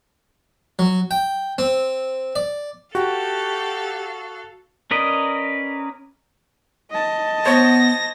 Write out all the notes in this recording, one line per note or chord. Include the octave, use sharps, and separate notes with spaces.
F#3
G5
C4
D5
F#4 G4 A4 F5
C#4 A#4 B4 D5 D#5
D#5 A5
B3 C5 C#5 A#6